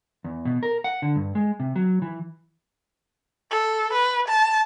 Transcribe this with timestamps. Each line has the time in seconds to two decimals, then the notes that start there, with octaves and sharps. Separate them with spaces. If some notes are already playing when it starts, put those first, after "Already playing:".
0.24 E2
0.45 B2
0.63 A#4
0.84 F#5
1.02 D3
1.16 G2
1.35 G#3
1.60 C3
1.76 F#3
2.02 E3
3.51 A4
3.93 B4
4.28 A5